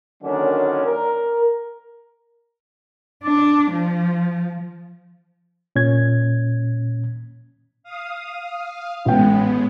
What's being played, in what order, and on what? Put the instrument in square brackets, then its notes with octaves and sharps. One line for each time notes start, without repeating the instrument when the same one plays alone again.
[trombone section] D3 D#3 F#3 A#3 C#4 D4
A#4
[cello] D4
F3
[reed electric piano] A#2 C#4 G#6
[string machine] F5 D#6
[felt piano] A1 G5 [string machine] A2 G#3 B3